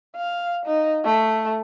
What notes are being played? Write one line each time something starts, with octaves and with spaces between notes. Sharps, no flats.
F5
D#4
A3